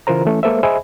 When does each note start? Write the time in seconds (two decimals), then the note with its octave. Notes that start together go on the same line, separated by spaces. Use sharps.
0.07 C#3 E3 F4 A#4 C5 A#5
0.25 E3 A3 C#4
0.43 G#3 A#3 A4 B4 C5 E5
0.63 G#4 C5 D#5 E5 G#5 B5